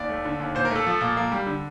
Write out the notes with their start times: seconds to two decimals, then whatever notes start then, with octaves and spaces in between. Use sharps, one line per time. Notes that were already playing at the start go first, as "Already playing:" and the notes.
Already playing: D#2 D5
0.09 A3
0.25 D3
0.39 D#2
0.55 A#2 C5
0.65 A#4
0.71 A3 A4
0.86 F3
1.01 A#2
1.17 A#3
1.32 G3
1.46 D3